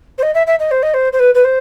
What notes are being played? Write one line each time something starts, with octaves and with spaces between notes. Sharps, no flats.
C5
D#5
E5
E5
D#5
C5
D#5
C5
C5
B4
B4
C5